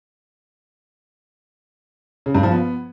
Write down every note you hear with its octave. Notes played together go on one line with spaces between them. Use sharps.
C#3
G2
F3
B3